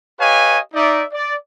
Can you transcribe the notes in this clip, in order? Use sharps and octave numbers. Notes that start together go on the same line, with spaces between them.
G4 B4 C#5 D#5 F5 G#5
D#4 D5 E5
D5